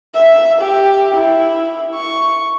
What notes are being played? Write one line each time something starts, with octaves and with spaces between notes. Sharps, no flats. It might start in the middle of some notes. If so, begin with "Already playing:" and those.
E5
G4
E4
C#6